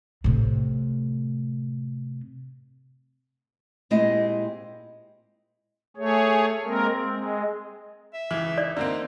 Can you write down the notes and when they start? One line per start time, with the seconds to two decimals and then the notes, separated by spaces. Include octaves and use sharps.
0.24 A2 C3
3.90 A#2 G#3 C4 E4 G4 D#5
5.97 A3 G#4 C#5
6.64 G#3 A#3 C4 A#4
7.02 G#3
8.14 E5
8.31 C#2 E3
8.58 D5
8.77 D3 A#3 C4 D#4